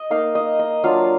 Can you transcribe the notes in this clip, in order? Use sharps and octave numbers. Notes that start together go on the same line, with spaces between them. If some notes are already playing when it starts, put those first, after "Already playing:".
Already playing: D#5
A#3 D#4 F5
D#5
D#5
F#3 D4 F4 F5